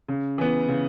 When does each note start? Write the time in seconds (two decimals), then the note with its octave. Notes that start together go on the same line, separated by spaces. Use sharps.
0.08 C#3
0.38 E3 B3
0.69 C#3